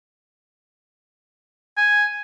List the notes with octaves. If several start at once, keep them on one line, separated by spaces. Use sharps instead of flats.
G#5